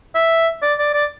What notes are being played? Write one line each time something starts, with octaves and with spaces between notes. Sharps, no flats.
E5
D5
D5
D5